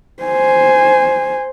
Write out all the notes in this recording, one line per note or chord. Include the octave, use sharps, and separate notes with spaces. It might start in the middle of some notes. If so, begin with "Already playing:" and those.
C5 G#5